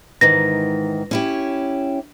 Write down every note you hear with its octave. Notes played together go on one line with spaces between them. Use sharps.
G#2 D#3 E3 A#6
C#4 E4 G4